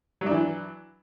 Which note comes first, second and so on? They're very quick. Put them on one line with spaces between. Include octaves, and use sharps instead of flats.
F#3 D4 E3